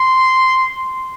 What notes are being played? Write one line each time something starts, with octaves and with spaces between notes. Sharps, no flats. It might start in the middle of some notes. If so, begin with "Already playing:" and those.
Already playing: C6